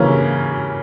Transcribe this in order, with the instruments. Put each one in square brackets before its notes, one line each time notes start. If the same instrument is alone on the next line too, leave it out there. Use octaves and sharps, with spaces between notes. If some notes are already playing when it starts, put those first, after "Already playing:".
Already playing: [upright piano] C#3 E3 A#3 C#4